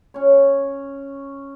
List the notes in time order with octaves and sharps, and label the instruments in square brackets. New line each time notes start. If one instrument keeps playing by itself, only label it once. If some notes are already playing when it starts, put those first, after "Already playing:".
[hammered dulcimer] C#4 C#5